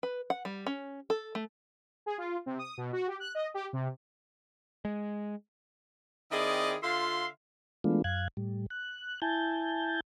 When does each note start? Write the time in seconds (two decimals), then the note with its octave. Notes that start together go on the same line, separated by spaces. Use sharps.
0.03 B4
0.30 F#5
0.45 G3
0.66 C#4
1.10 A4
1.35 A3
2.06 G#4
2.18 F4
2.46 C3
2.59 D#6
2.78 B2
2.93 F#4
3.08 G4
3.20 F#6
3.35 D#5
3.54 G4
3.73 C3
4.85 G#3
6.31 D#3 C4 E4 G#4 D5 D#5
6.83 D3 F4 E5 F5 C6
7.84 E3 G#3 A3 B3 D4 F4
8.04 F#2 F5 F#6 G#6
8.37 A2 G3
8.70 F#6
9.22 E4 G#5 A5 G6